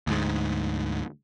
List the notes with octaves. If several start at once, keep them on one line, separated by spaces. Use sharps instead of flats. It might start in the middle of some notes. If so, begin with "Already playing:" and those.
D2 G#2